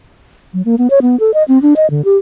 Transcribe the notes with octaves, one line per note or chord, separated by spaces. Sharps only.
F#3
A#3
B3
C#5
B3
A4
D#5
C4
D4
D#5
D3
G4